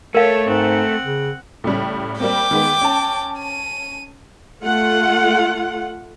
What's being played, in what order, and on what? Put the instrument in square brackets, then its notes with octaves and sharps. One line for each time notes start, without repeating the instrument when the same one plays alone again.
[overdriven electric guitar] A3 [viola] A4 C#5 [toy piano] A#4 F5
[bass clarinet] G#2 [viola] C4 F#5
[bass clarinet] C#3
[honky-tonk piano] A2 C#3 G3
[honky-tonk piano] G3 A#3 C4 [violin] G5 D6
[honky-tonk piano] D#3 G#3 B3
C#4 A5
[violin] D#7
[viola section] A3 F4 F#5